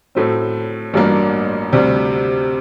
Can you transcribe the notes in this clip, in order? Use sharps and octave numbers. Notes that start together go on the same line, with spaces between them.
A2 F#3 A3 C4
A1 G2 F#3 A#3 D4
D2 C3 G3